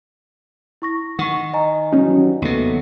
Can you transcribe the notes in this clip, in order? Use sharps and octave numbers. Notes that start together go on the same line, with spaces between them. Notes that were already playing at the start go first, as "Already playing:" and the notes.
E4 C#6 A#6
D#3 F#5 C#6
D#5 G#5 A#5
G2 E3 F#3 C#4 D#4
D#2 C3 F#3 A3 B3